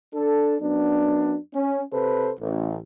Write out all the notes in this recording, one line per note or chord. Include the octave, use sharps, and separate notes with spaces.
D4 A4
F#2 B3 D4
C#4
C3 A4 B4 C5
A1